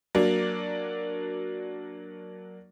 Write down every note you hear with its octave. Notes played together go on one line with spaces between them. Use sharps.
F#3 A#3 D4